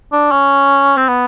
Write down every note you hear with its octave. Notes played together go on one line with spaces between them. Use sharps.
D4
C#4
C4
B3